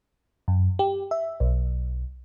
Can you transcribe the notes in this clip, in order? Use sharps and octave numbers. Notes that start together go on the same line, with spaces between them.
F#2
G4
E5
B1